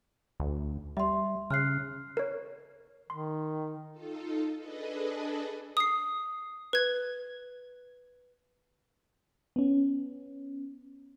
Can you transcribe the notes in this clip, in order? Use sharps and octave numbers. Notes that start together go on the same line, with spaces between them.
D2
G3 E5 C6
C#3 F6 F#6 C7
A#4 C#5
D#3 C6
D#4 F4 A4
D4 G#4 A4 B4 D#5
D#6 C7
B4 G#6
B3 C#4